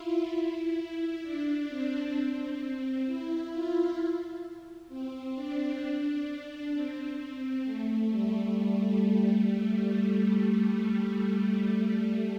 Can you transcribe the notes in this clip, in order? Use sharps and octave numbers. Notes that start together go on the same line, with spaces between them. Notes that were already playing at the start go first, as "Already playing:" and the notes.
Already playing: E4 F4
E4
E4
D4
C4
E4
F4
C4
D4
D4
C4
A3
G3